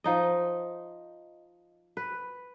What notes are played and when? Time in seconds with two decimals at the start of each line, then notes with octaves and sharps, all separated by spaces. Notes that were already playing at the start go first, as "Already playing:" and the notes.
0.04 F3 D#4 D#5
1.97 B4